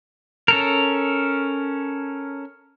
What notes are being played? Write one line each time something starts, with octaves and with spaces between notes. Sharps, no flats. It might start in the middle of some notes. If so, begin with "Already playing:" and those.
C#4 A4 A#4